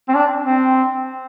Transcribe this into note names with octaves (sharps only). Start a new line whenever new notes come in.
C4
D4
C4